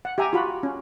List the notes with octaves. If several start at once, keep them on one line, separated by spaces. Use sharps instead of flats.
F#5
G4 E5 G#5 A#5
F4 F#4 B5
C#4